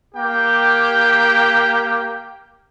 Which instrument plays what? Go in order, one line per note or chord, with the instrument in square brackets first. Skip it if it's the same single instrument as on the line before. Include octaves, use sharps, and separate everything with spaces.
[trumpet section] A#3 G4 G5